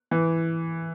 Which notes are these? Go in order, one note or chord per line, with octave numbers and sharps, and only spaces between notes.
E3